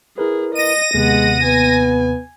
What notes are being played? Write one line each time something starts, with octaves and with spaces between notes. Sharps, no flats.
E4 G#4 A#4 B4
D#5 A#6 D#7
D#2 C3 G#3 B3 F#5
B3 G#5